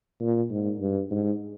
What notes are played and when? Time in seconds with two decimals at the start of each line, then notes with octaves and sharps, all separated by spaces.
0.20 A#2
0.51 G#2
0.80 G2
1.11 G#2